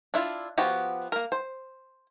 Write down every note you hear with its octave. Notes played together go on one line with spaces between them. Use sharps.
D4 E4 F4
F3 B3 F#4 G4
A#3 A#4
C5